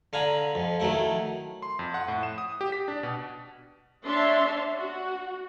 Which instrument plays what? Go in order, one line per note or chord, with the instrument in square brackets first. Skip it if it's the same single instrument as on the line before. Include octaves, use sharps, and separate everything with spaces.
[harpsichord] D3 F5 G#5 A#5 B5
F2
D#3 F#3 A3 E4
[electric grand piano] C6
F2
F#5
A2
E7
D#6
G4
B6
D4
B2
[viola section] D4 C#5 E5 A5 C6
F#4